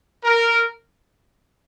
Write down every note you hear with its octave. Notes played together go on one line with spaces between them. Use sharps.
A#4